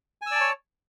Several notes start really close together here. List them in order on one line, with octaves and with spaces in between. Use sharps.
G#5 E6 D5 A5 C#5